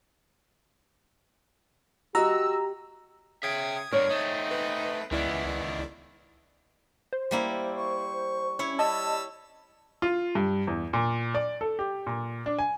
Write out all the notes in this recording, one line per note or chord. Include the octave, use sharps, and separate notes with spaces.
F#4 G4 D#5 A#5 E6
C#3 E5 G5 D#6 G#6
G2 D3 A#4 C#5
A3 C4 D#4
B4
C#2 D#3 E3 B3 E4 D5
C5
G3 A#3 E4
C#6
C#4 E4 C#5
G3 D#5 A5 E6
F4
G2
E2
A#2
D5
A4
G4
A#2
D4
G#5